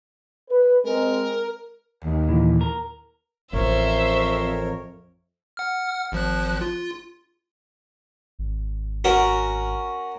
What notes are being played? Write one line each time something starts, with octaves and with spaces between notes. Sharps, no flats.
B4
G#3 C4 A#4
D#2
A#2 E3
A#4
A1 F2 A#4 C5 C#5 E5
F#5 F6
G#1 F3 F#6
F4
G#1
C#4 F#4 A#4